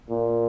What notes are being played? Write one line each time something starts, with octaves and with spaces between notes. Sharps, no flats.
A#2